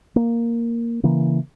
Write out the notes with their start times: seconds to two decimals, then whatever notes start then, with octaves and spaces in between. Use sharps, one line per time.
0.16 A#3
1.03 C#3 E3 A#3